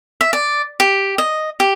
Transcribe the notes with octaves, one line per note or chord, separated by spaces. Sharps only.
E5
D5
G4
D#5
G4